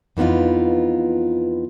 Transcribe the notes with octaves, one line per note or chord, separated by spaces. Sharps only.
F2 E3 B3 D#4 F4